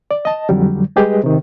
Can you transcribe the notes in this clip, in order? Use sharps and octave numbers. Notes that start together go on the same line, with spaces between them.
D5
D#5 A5
F2 D3 F#3 G3
G3 G#3 G4 G#4 B4 D#5
C3 D#3